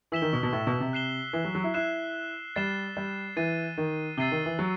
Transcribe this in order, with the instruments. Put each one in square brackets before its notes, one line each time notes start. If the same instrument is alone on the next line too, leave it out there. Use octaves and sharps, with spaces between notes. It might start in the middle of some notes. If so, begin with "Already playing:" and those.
[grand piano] E3 [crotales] E6 B6 E7 G7
[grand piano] D#3
B2
B2
A2
B2
C3
[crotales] F#6 C7 E7 G7
[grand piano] E3
F#3
F#3
E4
[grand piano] E4 [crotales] F#6 C7 E7
[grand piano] G3 [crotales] A6 C7 E7 G7
[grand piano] G3
[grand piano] E3 [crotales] A6 C7 D#7
[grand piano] D#3
[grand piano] C3 [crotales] E6 A6 C7 D#7 G7
[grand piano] D#3
E3
F#3